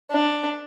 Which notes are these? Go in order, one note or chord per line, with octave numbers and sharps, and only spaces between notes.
D4